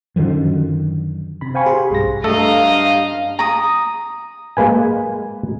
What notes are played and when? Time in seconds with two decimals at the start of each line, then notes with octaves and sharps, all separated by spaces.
0.16 F#2 D3 D#3 F3
1.41 C3 B5
1.54 C5 F5 G5 G#5 B5 C#6
1.66 G4 G#4 B5 C6
1.90 B1 G2 A#6
2.24 G2 A3 A4 D#5 F5 A#5
3.39 A#5 D#6
4.57 G#3 A#3 B4 G#5